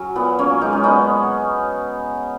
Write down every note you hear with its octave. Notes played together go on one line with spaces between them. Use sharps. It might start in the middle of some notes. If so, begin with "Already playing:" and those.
Already playing: F#3 C#4
A#2 B3
F#3 A#3 C#4
G#3 D#4
C#4
A#2 B3 D#4